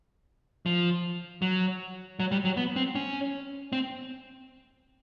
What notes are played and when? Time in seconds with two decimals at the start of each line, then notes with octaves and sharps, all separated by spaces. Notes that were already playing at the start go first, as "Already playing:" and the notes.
0.66 F3
1.42 F#3
2.20 F#3
2.32 G3
2.45 F#3
2.57 B3
2.76 C4
2.95 C#4
3.72 C4